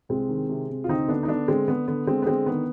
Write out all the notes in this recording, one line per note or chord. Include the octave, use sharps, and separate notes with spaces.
C2 G#3 C4
D#3
C3
C3
F4
D2 C4 D#4
D3 B3 D4
D#4
D3 B3 D4
D3 G#3 C4
D3 B3
D3 B3
D3 G#3 C4
B3
D3 G#3 C4
D#3 B3